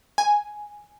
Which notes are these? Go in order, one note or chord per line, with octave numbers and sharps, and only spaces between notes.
G#5